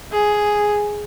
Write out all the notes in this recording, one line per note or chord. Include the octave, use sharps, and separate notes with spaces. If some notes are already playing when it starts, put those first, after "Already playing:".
G#4